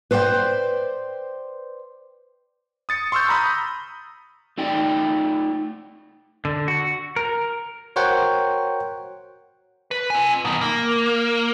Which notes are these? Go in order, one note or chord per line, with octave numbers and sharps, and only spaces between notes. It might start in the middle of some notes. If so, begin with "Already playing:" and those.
B4 C5 D5 F#5 G5
D#6 A6 C#7
C6 C#6 E6 F6 G6
A#5 B5 D#6
A3 D#4 D5 G5
D3
F#4
A#4
F#4 A#4 C5 C#5 F#5 G5
B4
C4 G#5
B2 D#3
A#3